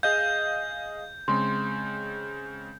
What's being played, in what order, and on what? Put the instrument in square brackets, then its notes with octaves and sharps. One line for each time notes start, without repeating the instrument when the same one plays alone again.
[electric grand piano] G#4 D#5 F5 [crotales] G6
[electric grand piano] C#3 G#3 C4 [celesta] C6